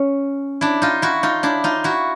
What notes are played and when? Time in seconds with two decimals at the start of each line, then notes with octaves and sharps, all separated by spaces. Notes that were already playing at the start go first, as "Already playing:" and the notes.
Already playing: C#4
0.61 D4 E4
0.82 D#4 F4
1.02 E4 F#4
1.23 D#4 F4
1.43 D4 E4
1.64 D#4 F4
1.84 E4 F#4